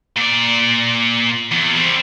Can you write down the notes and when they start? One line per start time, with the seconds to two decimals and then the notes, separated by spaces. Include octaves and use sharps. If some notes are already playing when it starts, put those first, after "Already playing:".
0.17 A#2 D5
1.51 E2
1.76 G3 C4